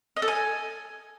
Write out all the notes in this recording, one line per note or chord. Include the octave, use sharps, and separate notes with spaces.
D#5
A4
G#5